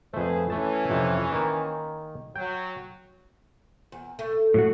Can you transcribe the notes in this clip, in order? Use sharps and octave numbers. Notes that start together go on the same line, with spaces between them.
F2 A3 G#4 B4 C5
E3 A3 C#4 A5
F2 C3
D#3 A#3
F#3 G5
E2
A3
A2 F#3 F#4